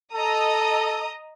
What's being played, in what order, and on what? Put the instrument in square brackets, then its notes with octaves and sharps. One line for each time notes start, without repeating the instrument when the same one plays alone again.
[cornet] A4 [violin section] D#5 A#5 D#6